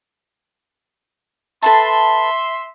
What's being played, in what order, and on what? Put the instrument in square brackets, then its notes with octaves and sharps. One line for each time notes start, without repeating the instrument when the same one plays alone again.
[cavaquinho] A4 B4 A5 [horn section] E5 C6